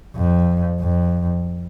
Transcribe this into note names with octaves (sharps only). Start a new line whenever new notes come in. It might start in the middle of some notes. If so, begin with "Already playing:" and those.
F2
F2